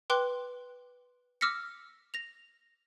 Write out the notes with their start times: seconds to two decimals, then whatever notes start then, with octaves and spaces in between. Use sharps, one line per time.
0.10 B4 G5 C6 D6 F#6 G7
1.41 D6 E6 F6 A#6 B6 C#7
2.14 A#6 F7